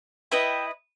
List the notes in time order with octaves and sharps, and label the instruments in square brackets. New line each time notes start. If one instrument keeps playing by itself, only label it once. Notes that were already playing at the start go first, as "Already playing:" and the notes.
[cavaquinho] E4 B4 D#5 E5 G5